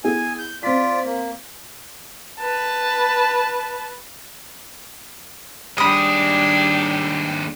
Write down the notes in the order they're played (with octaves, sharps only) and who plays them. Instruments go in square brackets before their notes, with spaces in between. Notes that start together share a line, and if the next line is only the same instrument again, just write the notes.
[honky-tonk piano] B3 E4 G#4 [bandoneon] G#5
[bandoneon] G6
[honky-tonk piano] C4 B6 [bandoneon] F4 D5
[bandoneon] A#3
[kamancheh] B4 A5
[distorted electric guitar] D#2 G#4 [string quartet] G3 G4 [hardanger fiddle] D4 [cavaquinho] B5 D#6